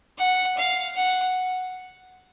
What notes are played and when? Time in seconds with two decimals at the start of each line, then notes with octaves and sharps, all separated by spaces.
0.19 F#5
0.58 F5
0.96 F#5